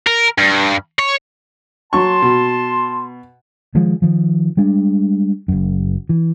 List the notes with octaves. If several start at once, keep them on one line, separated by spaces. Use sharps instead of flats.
A#4
G2
C#5
F#3 A5 C6 C#6
B2
D#3 F3 G#3
D#3 F3
G3 G#3 D4
F#1 F#2
E3